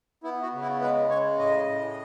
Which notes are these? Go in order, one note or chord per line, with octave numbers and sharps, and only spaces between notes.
B3 E4
F#4
C#3
E4
G#3 B4
C#3 C#5
A2 D#5
A2